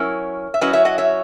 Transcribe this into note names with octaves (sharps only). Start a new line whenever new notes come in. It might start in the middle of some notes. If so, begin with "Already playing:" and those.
Already playing: F#3 C#4 E4 A#4 C#5
E5
F#3 C#4 E4 B4 D#5
C#5 E5
D#5 F#5
C#5 E5